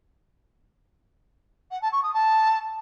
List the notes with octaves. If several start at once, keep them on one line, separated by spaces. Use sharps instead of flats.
F#5
A5
C#6
D#6
A5